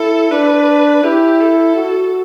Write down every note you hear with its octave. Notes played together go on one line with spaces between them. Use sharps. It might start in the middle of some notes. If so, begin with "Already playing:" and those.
Already playing: E4 A4
D4 B4
E4 G4
A4
F#4